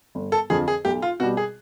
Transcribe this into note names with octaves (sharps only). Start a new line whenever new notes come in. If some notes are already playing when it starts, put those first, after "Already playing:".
G1
A4
F2 D3 F3 G#4
G#4
B1 G4
F4
B2 G3 F#4
G#4